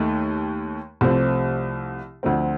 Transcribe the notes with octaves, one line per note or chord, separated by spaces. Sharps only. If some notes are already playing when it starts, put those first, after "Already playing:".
Already playing: D#2 D#3 A3 D#4
C2 C3 F3 A3 C4
D2 D3 F3 A3 C4